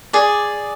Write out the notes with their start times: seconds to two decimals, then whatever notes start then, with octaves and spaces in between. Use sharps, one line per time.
0.13 G#4 D5